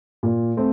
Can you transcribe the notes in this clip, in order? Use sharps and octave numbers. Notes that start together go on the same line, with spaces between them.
A#2
A3 C4